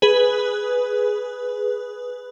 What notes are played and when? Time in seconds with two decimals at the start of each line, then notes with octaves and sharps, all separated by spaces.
0.02 G#4 B4